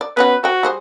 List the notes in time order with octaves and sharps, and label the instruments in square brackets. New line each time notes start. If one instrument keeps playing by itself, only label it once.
[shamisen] D5
[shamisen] B3 C#4 F#4 [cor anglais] B4
[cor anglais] F#4 [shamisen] C5 G5
[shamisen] G3 G#4 C5